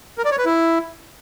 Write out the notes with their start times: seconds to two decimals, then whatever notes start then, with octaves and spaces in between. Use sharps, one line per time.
0.18 A#4
0.25 D5
0.32 C#5
0.38 B4
0.45 E4